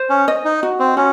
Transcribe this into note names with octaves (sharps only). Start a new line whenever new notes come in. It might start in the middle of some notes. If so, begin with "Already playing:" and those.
Already playing: C5
C#4
D#5
D#4
F#4
C4
C#4 F#4